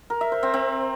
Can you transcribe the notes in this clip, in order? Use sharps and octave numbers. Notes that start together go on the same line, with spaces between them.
A#4
E5
C5
C4
C4